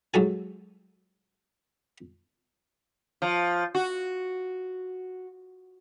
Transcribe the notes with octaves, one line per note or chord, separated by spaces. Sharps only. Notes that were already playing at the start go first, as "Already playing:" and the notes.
G#2 F#3 A4 G#5
F3
F#4